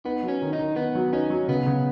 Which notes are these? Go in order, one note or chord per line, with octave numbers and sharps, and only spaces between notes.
B3 D#4
F#3
C#4
D#3
D#4
D#3
D#3 B3
F#3
C#4 D#4
F#3
C#3 B3
C#3